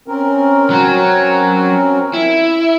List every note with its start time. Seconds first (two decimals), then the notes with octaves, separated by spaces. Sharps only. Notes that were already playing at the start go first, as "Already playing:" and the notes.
0.08 C4 C#4 A#4
0.70 F#3 F#4
2.14 E4